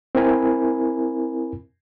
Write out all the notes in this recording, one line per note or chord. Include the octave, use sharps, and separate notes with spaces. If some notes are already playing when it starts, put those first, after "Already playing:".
C4 E4 A#4 G#5 B5